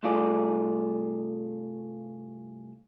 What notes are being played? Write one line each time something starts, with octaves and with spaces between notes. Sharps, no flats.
C2 G2 A3 F4 G#4 D5